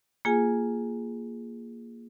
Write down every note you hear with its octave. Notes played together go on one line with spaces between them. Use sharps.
A#3 F4 G#4 G#5